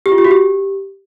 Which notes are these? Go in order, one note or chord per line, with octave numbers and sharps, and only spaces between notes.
G4
F4
G4
F#4
G4